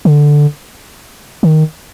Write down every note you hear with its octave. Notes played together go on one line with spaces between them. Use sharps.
D3
D#3